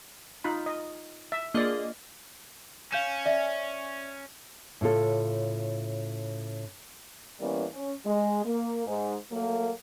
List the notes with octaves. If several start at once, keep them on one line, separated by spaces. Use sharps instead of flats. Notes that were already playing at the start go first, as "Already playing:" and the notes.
D#4 F4 B5
D#5
E5
A#3 D4 F4 G#4 D5 D#5
C#4 F5 G6 E7
D5 E5
A2 C#3 F4 A4
E3 G3 A#3 B3 C#4
C#4
G#3
A#3
G#2
F#3 A3 A#3